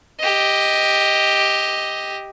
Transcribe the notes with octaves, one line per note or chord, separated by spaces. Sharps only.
G4 D#5